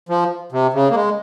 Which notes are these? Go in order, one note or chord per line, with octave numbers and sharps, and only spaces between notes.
F3
C3
C#3
A#3
G#3